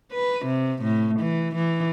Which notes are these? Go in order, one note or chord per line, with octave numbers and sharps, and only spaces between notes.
B4
C3
A2
E3
E3